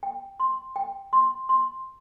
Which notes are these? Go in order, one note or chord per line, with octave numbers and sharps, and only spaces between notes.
G5
C6
G5
C6
C6